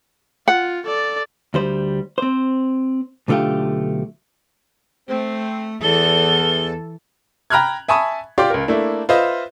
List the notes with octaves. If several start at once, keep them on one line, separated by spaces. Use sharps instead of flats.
F4 F#5
A4 D5
D2 G3 C5
C4 C5
B1 D3 A3 F4 G4
A3 C4
E2 E3 A4 G7
G5 A#5 B5 F6 F#6 G#6
E5 G#5 A5 B5 C#6 D#6
F4 G4 D5 C6 D6
C#2 A#4
A3 A#3 D4 E4
F4 B4 C5 D#5 E5